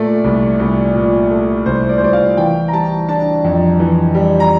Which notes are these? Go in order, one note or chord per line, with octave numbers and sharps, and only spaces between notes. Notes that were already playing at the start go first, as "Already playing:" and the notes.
Already playing: A#2 A3 D5
C2
C2
A#2
A3
C2 C5
D5
C5
C2 D5
F5
E3 G5
A#5
G3 A5
D4 A5
F2
E3
G3
A#5